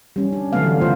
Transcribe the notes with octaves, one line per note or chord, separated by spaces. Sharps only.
G3 C#4
D4
D3 E3 F#3 A3 B3 F5
C#3 A3 F4 C5